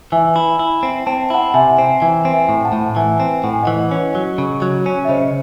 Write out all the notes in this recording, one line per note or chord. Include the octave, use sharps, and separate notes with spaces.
E3 E5 G#5
E4
E4
C4
C4 A5
E4 F#5 A5
C3 E5 G#5
C4
E3 E5 G#5
C4
E5 G#5
A2
F#5 A5
A2
E3 E5 G#5
C4
A2 F#5
G#5
E3 D#5 F#5
C#4
F#3
C#3
F#3
C#4
E5
C#3 C5 D#5